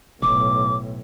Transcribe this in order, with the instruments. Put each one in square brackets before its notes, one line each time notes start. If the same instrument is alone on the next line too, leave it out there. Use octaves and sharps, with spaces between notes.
[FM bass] F1 [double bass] B1 A2 [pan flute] D6